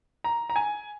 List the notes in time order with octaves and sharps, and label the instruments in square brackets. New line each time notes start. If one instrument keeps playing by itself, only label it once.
[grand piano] A#5
A#5
G#5